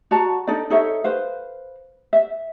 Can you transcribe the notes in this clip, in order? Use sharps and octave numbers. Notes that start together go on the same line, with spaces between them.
F#4 D5 A5 A#5
D4 D#4 A4 D5
D#4 A4 C#5 E5
B4 C5 F5
E5